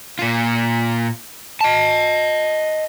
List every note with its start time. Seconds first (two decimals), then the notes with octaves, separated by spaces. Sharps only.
0.19 A#2 F4
1.61 D#5 A5